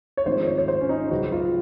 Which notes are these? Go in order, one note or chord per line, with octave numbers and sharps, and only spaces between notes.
C#5
G#1 G#2 F3 C5
C#5
C#5
C5
C#4
D#4
C#2 C#3 F#3 F#4
F4